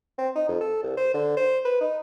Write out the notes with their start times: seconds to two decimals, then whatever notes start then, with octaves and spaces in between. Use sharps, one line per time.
0.18 C4
0.36 D#4
0.49 F2
0.61 A4
0.83 C2
0.97 C5
1.14 D3
1.37 C5
1.65 B4
1.81 D#4